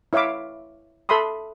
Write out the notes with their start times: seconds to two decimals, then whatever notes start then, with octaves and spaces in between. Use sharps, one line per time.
0.13 E4 C#5 E5 F5 D6
1.09 A4 E5 B5 C6 D#6